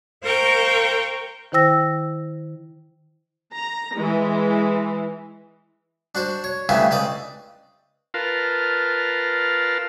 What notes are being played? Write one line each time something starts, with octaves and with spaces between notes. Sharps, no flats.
A#4 C5 F5 G5 A#5 C#6
D#3 E4 C5 G5 E6 A#6
A#5
E3 G#3
D4 F#4 C5
C#5
G2 C#3 E3 A3 C4 F4
C#2 C4 D5 D#6
F4 A#4 B4 F5 A5